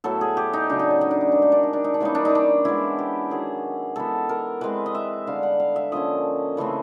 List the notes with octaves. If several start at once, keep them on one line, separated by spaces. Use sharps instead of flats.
A2 F#3 B3 A4
G#4
G4
D#4
C#3 F#3 A3 D4
D#4
D4
D#4
D4
D#4
D#3 G#3 C#4 D4
D#4
D4
D#4
D4
D#4
D4
E3 G3 A#3 C#4 D#4
D4
D#4
D4
E3 G#3 B3 E4
G4
D#3 F#3 B3 G#4
E3 G#3 B3 A4
A#4
E3 G#3 C4 B4
D#5
E5
D3 G3 B3 F5
F#5
F5
E5
D3 F3 A#3 C#4 D#5
C#3 E3 A3 C4